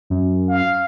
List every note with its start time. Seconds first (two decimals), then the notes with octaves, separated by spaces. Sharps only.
0.10 F#2
0.49 F5